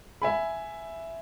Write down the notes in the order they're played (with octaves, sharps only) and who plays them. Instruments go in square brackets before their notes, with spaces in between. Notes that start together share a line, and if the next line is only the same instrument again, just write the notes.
[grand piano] E5 G#5 B5